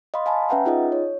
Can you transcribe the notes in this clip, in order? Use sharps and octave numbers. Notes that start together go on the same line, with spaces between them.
D#5 F5 B5 C6
F5 G#5 A5 B5
C#4 B4 E5 F#5 G5 A#5
D#4 F4 G#4 D#5
C#5